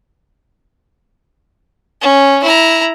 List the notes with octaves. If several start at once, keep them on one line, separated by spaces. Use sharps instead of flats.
C#4
E4 A#5